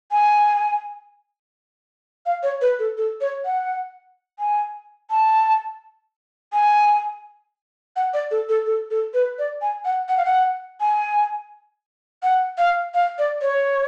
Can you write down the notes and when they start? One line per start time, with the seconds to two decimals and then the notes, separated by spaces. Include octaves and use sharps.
0.11 G#5
2.26 F5
2.43 C#5
2.61 B4
2.79 A4
2.98 A4
3.21 C#5
3.45 F#5
4.39 G#5
5.10 A5
6.53 G#5
7.96 F#5
8.14 D5
8.31 A4
8.49 A4
8.66 A4
8.91 A4
9.14 B4
9.39 D5
9.62 G#5
9.85 F#5
10.09 F#5
10.18 F5
10.25 F#5
10.81 G#5
12.23 F#5
12.58 F5
12.94 F5
13.19 D5
13.41 C#5